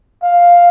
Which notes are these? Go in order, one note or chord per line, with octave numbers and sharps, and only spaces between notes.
F5